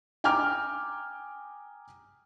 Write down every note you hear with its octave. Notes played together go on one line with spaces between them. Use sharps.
G5 G#5 A#5 D6 F6